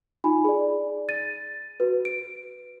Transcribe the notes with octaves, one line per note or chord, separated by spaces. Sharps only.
D#4 F4 G#5 B5
G#4 D5
A6 D#7
F#4 B4
D7